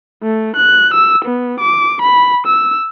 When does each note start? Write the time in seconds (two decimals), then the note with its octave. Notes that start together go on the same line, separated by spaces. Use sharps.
0.24 A3
0.56 F#6
0.94 E6
1.25 B3
1.61 D6
2.02 B5
2.47 E6